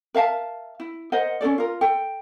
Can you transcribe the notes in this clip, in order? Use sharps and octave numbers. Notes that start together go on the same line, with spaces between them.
A#4 E5 F5 A5
E4
A#4 C5 D#5 F#5
C#4 D4 A4 D5
F4 A#4
A4 G5